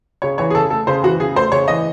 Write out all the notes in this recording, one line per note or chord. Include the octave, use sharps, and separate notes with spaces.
C#3 C#5
E3 C#5
G#4
C#3 A4
A3 A4
C#3 C5
E3 F#4
C#3 G#4
A3 C5
C#3 C#5
E3 D#5